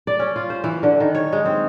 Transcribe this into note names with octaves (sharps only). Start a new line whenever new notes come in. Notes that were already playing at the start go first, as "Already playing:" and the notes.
D5
C#4
F4
C5
E3
D3
D#3
C#5
G#3
C4